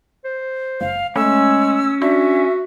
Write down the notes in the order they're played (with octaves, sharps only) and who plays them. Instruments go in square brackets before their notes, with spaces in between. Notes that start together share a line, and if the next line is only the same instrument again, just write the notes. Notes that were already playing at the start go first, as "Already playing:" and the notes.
[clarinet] C5
[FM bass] F#1 [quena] F5
[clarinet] G#3 [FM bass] A3 [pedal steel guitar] C#4 [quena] E6
[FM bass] D4 [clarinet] F#4 [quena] E5